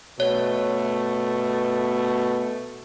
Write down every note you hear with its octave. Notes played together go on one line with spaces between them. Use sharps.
B2 A3 C#5